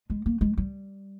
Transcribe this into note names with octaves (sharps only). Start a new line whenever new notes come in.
G#3
A#3
G#3
G3